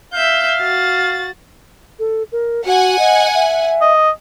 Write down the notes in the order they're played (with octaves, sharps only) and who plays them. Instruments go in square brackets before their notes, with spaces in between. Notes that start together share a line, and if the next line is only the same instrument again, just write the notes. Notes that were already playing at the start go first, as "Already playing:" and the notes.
[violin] E5 G6 [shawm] F5
[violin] F#4 A6
[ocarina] A4
A#4
[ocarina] F#4 [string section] F#5 G#5
[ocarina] D#5
E5
[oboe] D#5